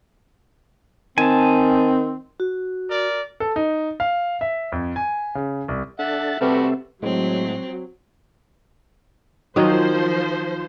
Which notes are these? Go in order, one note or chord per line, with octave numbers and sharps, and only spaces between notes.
D#3 C4 G#5 A5
F#4
A#4 D5
A4
D#4
F5
E5
F2
G#5
C#3
C2
D4 A4 E5 F#5 A6
C3 G3 A3 F#4 A4 B4 C5 E5
A2 F#3 G#3 C4
D#3 F3 F#3 D#4 C5